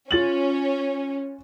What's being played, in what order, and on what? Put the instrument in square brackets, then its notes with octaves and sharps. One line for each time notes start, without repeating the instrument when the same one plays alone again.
[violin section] C#4 [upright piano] F4 A6 F#7